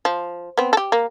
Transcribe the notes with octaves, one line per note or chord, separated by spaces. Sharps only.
F3
B3 C4
G4 A4
A#3